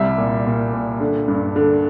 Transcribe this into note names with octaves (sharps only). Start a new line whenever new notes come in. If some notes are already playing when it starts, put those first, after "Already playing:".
Already playing: C2 G3 E5
A#2
A#2
A#2
D3
G2
D3